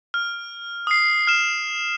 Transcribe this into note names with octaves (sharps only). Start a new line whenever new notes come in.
F6
D#6 C7
F6 E7